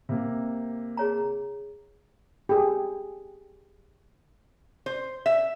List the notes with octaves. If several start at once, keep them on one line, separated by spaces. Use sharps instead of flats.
C3 A#3
G#4 C#5 A#5
G4 G#4
C5
E5